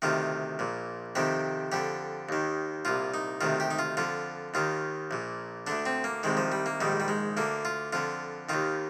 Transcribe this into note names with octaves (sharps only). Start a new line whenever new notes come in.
D2 C3 D#3 F4
A#1 A#2
F2 C3 D#3 G4
F2 D3 G4
D#2 D#3
C2 A#2 F4
D#4
D2 C3 D#3 F4
G4
D#4
F4
F2 D3 F4
D#2 D#3 F4
A#1 A#2
D2 D3 D4
C4
A#3
C2 C3 D#3 G#3
F3
G3
A#3
A#1 G#2 D#3 G3
G3
G#3
D2 D3 A#3
F4
F2 D3 F4
D#2 D#3 F4